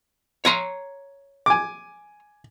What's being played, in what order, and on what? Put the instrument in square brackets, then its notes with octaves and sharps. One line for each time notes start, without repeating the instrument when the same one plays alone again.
[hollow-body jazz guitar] C#5 A#5 C6
[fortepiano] G#5 D6